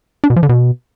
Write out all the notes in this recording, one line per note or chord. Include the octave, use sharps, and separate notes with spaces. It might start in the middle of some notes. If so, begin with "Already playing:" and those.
D4
B2
F3
D3
B2